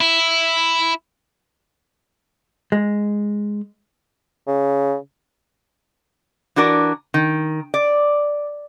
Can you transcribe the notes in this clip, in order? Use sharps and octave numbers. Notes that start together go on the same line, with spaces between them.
E4
G#3
C#3
E3 D4 F#4 A#4 D5
D#3
D5